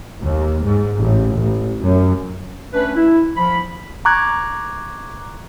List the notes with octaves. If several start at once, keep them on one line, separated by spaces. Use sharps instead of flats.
D#2
G#2
A1
A1
F#2
A3 C#4 D4 B4
E4
F3 B5
A#5 C#6 D6 F#6 G#6